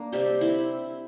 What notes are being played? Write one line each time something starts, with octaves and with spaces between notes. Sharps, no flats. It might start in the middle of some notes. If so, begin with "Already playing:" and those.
Already playing: A#3 D4
C3 G3 C4 G4
C4 E4